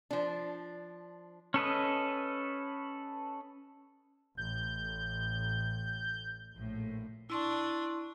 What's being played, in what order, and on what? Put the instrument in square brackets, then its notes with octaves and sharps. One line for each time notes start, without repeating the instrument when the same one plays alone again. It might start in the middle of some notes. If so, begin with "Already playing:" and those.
[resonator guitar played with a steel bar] F3 D4
[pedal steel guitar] C#4 A4 B4 D#5
[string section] A1 [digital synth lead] G6
[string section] A#1 A2
[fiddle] D4 [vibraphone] E4 C6 C#6